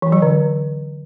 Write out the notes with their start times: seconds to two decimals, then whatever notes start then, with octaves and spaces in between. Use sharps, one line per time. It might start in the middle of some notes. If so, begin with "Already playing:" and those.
0.02 E3
0.12 F#3
0.22 D3